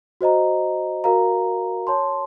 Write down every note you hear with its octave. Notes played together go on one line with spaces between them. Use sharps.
F#4 C5 D#5 A#5
F#4 A#4 F5 A#5
C#5 A5 C6